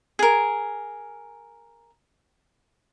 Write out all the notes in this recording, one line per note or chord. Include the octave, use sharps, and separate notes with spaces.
G#4 A#4